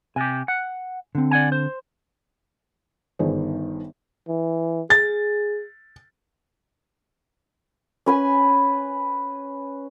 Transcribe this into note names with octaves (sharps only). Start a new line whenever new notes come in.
C3 G4 G#5
F#5
D3 C4
D5 F#5 G#5
C5
G1 G2 D#3 G#4 C5
E3
G#4 A6
C#4 B4 G#5